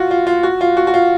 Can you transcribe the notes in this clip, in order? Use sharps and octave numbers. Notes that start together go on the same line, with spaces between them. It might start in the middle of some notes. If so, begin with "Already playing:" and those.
Already playing: F4 F#4
F4
F4
F#4
F4
F#4
F#4
F4